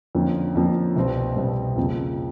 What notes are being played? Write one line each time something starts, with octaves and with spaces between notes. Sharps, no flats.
F2 D3 F3 A#3 C#4
F2 D3 F3 A#3 C#4
C2 B2 G3 C4
C2 B2 G3 C4
F2 C#3 F3 A#3